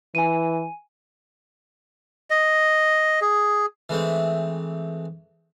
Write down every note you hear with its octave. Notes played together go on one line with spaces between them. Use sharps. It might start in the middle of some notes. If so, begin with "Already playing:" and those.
E3 G#5 D#7
D#5
G#4
E3 G#3 A3 C4